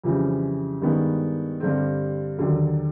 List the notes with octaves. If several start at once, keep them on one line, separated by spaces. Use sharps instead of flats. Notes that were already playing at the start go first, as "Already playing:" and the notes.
F2 C#3 E3 G3
G2 D#3 G#3 B3
G2 D3 G3 C4
D#2 D3 F#3